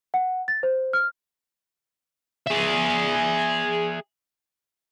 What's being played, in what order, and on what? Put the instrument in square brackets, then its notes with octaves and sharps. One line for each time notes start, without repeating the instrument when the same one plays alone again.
[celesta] F#5
A6
C5
F6
[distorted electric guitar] G#4 E5